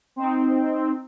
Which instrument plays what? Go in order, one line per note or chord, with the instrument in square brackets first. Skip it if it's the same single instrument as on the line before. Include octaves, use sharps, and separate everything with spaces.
[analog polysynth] C4 D#4